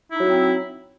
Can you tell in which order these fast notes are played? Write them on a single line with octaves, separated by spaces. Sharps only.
E4 D#4 F#3 C4